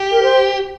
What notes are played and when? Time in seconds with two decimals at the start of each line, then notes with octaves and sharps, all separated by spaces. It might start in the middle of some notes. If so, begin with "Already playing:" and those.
Already playing: G4
0.12 A#4
0.23 C5